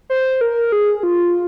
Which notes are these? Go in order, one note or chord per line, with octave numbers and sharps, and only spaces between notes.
C5
A#4
G#4
F4